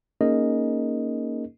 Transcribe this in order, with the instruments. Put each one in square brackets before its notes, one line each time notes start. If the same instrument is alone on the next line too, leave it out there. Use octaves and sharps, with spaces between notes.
[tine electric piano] A#3 C#4 D#4 G#4 A#4 D#5